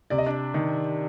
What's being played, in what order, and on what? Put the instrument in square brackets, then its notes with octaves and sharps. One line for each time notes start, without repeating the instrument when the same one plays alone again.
[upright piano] C3 [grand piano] D5
[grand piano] D#5
D4 D5
[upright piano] D#3